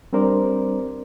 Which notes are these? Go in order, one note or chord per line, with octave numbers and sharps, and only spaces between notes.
G3 C4 D4 A#4 C5 D5